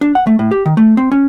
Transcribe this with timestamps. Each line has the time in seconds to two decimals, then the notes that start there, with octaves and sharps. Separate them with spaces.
0.01 D4
0.15 F#5
0.27 A3
0.39 A2
0.51 G4
0.66 D#3
0.77 A3
0.97 C4
1.12 C#4